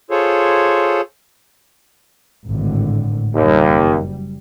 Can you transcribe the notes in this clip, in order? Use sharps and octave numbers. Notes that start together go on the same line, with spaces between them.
F4 G#4 A4 C5 C#5
G#1 A2 D3
F#1 D#2 G3